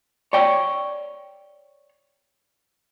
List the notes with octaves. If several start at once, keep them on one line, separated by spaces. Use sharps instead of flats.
C#5 D5 G5